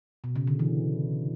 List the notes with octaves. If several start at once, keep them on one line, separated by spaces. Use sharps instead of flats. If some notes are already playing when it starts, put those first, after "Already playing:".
B2
C#3
D3
E3